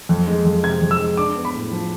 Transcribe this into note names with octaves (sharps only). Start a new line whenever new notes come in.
F2
G#3
F2
C3 G#6
F2
E6
G#3
D4 D6
B3
B5
A2
F3